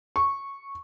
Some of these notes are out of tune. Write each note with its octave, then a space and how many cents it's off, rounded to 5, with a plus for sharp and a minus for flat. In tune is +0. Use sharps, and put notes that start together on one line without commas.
C#6 -10